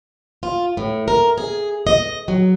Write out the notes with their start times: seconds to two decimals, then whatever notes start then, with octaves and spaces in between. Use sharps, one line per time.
0.43 F4
0.77 A2
1.08 A#4
1.38 G#4
1.87 D#5
2.28 F#3